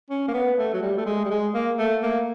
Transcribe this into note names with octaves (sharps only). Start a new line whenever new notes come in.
C#4
A#3
B3
A3
F#3
G3
A3
G#3
G3
G#3
A#3
A3
A#3